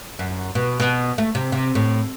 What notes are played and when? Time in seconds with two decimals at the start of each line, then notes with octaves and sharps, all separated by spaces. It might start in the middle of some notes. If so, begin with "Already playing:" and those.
0.19 F#2
0.55 B2
0.80 B2
1.18 A3
1.35 C3
1.52 C3
1.75 A2